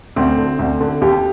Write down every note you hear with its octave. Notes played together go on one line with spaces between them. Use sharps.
D2 C4
D3
D2
D3
D#2 G4